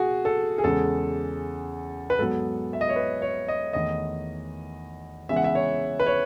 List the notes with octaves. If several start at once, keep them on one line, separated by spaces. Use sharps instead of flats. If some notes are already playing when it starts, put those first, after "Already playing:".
Already playing: B2 F#4 G#4
A4
G#4
E2 C#3 G#3 A4
B4
G#2 F#3 B3 A4
E5
D#5
C#5
B4
C#5
D#5
E2 D#3 A3 D#5
C#3 E3 G#3 B3 E5
F#5
E5
C#5
B4
C#5